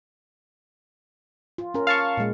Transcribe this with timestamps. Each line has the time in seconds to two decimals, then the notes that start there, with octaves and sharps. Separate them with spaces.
1.58 F4
1.74 C#4 A#4
1.87 F5 A5 C#6
2.17 A#2 G#3